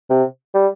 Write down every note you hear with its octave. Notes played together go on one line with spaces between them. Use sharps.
C3
G3